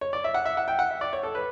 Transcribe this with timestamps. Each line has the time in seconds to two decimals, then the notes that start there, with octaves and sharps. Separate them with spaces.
0.01 C#5
0.13 D5
0.24 E5
0.34 F#5
0.45 E5
0.57 F#5
0.68 G5
0.79 F#5
0.91 E5
1.01 D5
1.13 C#5
1.23 A4
1.35 B4